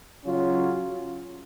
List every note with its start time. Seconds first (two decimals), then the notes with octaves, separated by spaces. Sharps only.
0.24 C#3 F#3 C#4 F4